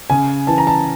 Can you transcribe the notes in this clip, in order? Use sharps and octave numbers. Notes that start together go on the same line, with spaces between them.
C#3 G#5
E3 A5
A#5
A5